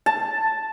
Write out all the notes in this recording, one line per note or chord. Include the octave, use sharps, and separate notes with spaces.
A5